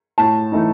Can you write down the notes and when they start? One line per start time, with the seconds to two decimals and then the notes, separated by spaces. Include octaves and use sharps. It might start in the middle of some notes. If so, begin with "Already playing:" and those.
0.18 A2 A5
0.52 E3 A3 D#4